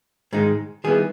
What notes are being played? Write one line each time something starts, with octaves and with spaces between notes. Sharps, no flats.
G#2 D#3 G#3 D#4
D#3 G3 B3 E4 G#4